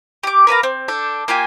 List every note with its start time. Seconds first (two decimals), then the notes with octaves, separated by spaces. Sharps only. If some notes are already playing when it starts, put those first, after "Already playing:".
0.23 G4 D6
0.47 A#4 B4 F5 A#5
0.63 C4
0.88 D4 A4 G5
1.28 A#3 F4 G4 G#5